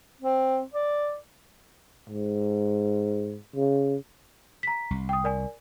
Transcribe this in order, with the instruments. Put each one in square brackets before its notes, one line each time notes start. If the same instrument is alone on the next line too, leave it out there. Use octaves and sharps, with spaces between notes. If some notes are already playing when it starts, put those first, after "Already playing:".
[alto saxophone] C4
D5
[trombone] G#2
C#3
[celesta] A#5 B6
[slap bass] C2
[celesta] G5 D#6
A#4 D5 G#5